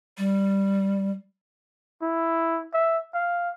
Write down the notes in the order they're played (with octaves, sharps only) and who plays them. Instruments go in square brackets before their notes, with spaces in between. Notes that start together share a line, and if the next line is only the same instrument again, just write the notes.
[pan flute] G3
[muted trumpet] E4
E5
F5